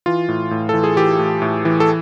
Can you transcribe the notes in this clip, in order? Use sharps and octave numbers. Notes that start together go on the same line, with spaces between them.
E3 F4
A2
A2
E3 A4
G#4
E3 G4
A2
A2
E3
A4